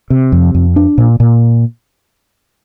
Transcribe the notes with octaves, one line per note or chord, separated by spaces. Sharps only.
C3
F2
F2
D4
A#2
A#2